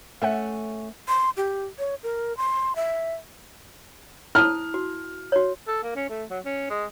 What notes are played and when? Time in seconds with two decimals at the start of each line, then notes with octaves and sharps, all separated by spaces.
0.22 A3 C#4 E5 F#5
1.08 C6
1.37 G4
1.79 C#5
2.03 A#4
2.37 C6
2.76 E5
4.35 E4 A5 D#6 F6
4.74 F#4
5.32 F#4 C#5
5.67 A4
5.83 A#3
5.96 C#4
6.09 A3
6.30 F#3
6.45 C#4
6.70 G#3